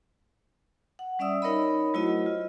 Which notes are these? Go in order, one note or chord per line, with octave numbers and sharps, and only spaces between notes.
F#5
G3 C#4 D5 E5 D#6 E6
D#4 A#4 C#5 D#5 B5
F#3 A3 E4 F#4 C5 D#5
F4